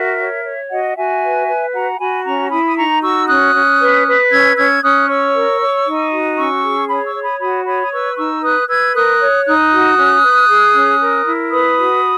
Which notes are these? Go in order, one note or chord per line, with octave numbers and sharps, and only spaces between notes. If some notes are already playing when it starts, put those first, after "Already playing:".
Already playing: F#4 A#4 E5
C#5
C#5
F#4 D#5 F#5
F#4 E5 G#5
B4
B4
F#4 F#5 A#5
F#4 G#5 B5
C#4 A#5 C#6
E4 B5 D#6
D#6
D#4 A#5 C#6
F#4 C#6 E6
C#4 D#6 F#6
C#4
B4
B4
C#4 E6 G#6
C#4 E6 G#6
C#4 D#6 F#6
C#5 C#6 E6
A#4
C#5
D#4
F#4
C#4 C#6 E6
G#4
C#5 B5 D#6
C#6 E6
C#5
B5 D#6
F#4 B5 D#6
C#5 B5 D#6
D#6
B4 C#6 E6
D#4 C#6 E6
B4 D#6 F#6
B4 E6 G#6
A#4 D#6 F#6
C#5
D#4 D#6 F#6
F#4
C#4
B4
G#4
C#4
A#4
E4
B4 B5 D#6
F#4